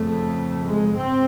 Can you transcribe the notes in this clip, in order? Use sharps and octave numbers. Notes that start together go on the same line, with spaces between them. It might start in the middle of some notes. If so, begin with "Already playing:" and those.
Already playing: F2 C#3 A3
G#3
G#2 C4